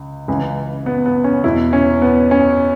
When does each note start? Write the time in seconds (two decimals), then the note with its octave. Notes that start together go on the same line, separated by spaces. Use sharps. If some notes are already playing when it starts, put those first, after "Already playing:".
Already playing: C#2
0.28 C#2 C#3 E3
0.86 B3
1.06 B3
1.24 C#4
1.43 E2 B2 E4
1.73 C#4
2.02 B3
2.31 C#4